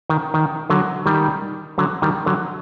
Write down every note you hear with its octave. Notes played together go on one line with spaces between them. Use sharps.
D#3
D#3
D3 F#3
D#3 G3
D3 F#3
D#3 G3
D3 F#3